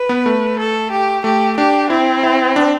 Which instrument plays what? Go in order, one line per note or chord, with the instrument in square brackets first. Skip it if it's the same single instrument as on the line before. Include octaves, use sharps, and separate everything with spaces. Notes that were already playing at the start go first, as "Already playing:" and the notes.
Already playing: [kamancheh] B4
[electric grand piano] B3
A3
[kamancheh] A4
G4
[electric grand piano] A3 [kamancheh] G4
[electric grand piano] D4 [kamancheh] G4
[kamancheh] C4 [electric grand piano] E4
[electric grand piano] E4
D4